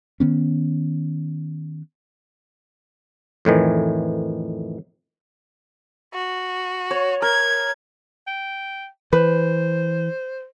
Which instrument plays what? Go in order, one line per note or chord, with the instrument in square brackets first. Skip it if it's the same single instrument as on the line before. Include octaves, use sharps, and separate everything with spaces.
[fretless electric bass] D#3 B3 C#4
[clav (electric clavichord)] F2 A2 D#3 E3
[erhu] F#4
[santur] C#5
[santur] A#4 [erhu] G#6
[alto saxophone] G5
[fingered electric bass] E3 [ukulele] B4 [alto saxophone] C5